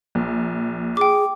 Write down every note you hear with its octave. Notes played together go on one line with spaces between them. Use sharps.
A#1
G#4 G5 D6